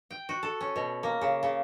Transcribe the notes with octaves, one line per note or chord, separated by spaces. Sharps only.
G5
F#4
A4
C#4
B2
A#3
C#3
C#3